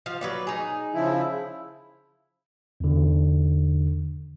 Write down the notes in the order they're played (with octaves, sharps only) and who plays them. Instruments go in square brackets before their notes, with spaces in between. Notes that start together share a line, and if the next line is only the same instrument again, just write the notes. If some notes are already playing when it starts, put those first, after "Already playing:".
[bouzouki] F3 F5
F#3 B4 D5
D#4 G#4
[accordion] C#3 F3 E4
[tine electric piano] E2 D3